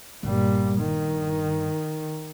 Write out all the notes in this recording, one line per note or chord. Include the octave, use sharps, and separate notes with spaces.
G1 G2 A#2 G3
D#3